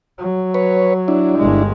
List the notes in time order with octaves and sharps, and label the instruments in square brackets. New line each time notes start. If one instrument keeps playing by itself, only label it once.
[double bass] F#3
[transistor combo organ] B4 C#5
D4 E4
[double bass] G1 G#3